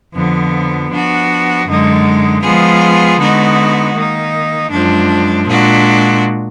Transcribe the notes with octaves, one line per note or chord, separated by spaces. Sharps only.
F2 D3 F3 B3
F3 B3 D4 F#4
F#2 D3 G#3 D#4
F3 G#3 B3 F4 G#4
D3 G#3 B3 D#4 F#4
D#3 A#3 D#4
F#2 F3 G#3 D4
A#2 G#3 D4 F#4